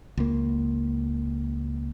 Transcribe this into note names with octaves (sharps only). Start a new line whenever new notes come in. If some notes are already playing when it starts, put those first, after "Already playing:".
C#2 A#3